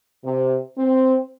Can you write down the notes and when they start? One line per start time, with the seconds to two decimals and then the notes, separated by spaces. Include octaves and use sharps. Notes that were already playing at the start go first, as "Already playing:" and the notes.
0.24 C3
0.77 C4